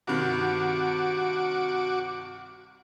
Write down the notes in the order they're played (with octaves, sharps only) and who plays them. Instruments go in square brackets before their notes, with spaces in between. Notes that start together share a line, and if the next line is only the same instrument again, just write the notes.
[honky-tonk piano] G2 C3 D#3 [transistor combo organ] F#4 D6